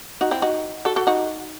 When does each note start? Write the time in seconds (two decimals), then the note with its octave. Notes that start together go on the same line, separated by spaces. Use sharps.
0.21 D#4 F#4
0.31 C4 E4
0.42 D#4 F#4
0.85 F#4 A4
0.96 F#4 A4
1.07 D#4 F#4